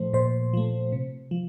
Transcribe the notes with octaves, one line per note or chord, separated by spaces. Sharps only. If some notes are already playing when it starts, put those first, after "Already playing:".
Already playing: A#2 F3 A3 C5
A#2 C5
F3 A3
C3
F3